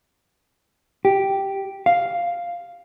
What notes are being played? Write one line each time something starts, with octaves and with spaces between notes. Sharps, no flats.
G4
F5